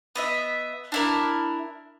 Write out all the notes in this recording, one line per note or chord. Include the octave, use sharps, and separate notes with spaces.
B3 D#5 E5
D4 E4 A#4